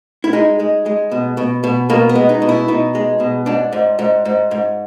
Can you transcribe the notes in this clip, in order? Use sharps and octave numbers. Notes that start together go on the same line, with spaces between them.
E4
G#3 D#4
G#3
G#3
B2
B2
B2
B2 A#3
B3
G#3
D#4
B2
E4
B2 D#4
G#3
B2
G#2 D4
G#2
G#2
G#2
G#2